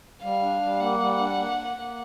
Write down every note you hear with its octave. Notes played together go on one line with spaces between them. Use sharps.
G3 F5
D4
G3
A#3 F#5
G3
D4
A#3
A#3
A#3